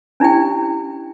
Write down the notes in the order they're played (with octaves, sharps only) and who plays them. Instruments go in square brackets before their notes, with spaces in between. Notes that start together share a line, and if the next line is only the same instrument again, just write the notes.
[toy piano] C#4 D4 E4 G4 G5